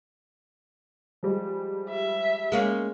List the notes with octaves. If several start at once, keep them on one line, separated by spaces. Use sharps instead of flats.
F3 G3 G#3
E5
G#3 A#3 C#4